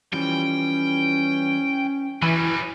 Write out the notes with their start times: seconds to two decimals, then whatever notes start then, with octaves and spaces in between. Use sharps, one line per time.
0.13 E3 F3 G3 C#4 G5
2.22 E3 F#3 G3 D#5 G#5 B5